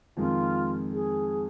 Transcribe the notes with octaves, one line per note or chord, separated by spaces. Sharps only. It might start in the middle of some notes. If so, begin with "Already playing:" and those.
F2 D#3 G#3 F4
G#4